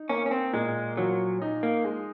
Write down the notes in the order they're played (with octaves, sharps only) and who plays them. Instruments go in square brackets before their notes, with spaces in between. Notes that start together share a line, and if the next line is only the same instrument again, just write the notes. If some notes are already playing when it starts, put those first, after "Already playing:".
Already playing: [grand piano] D#4
[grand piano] A#3 [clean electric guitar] C#4
[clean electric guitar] C#4
C4
[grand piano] A#2 [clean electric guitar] G#3
[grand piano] F3 [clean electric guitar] F#3
[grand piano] D#4
[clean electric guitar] A#3
[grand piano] G#3